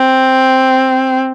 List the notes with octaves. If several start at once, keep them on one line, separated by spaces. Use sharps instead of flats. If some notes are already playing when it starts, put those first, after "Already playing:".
Already playing: C4